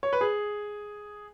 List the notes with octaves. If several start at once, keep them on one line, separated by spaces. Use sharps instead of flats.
C#5
B4
G#4